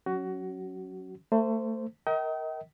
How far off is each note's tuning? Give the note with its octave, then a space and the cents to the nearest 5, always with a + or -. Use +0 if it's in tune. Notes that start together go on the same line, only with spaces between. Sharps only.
F#3 -10 C#4 +0 F#4 +20
A3 +25 C5 -10
A#4 +0 D#5 +35 G5 -35